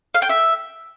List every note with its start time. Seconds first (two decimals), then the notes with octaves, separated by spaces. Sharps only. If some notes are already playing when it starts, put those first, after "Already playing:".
0.15 F5
0.22 G5
0.30 E5